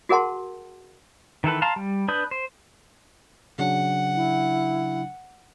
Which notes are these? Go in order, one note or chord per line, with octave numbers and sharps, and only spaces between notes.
F#4 G#4 A#4 F#5 A5 C6
D#3 E3 A4 B4
F5 A5 A#5 C6
G3
D4 B4 B5 D#6 G6
C5
C#3 F#3 D4 F#5
E4